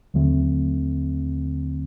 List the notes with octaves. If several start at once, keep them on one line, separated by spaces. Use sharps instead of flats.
D#2 D3 F#3 A3 C4